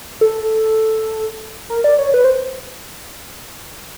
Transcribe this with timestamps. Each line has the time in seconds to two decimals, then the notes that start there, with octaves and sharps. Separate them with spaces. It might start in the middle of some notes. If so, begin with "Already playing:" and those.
0.21 A4
1.70 A#4
1.84 D5
1.99 C#5
2.14 B4
2.24 C5